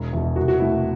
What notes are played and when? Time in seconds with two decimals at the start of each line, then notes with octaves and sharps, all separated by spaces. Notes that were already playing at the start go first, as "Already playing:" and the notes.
Already playing: E1
0.13 E2 B2
0.36 C2 F#4
0.48 F#4
0.59 B2 A3 E4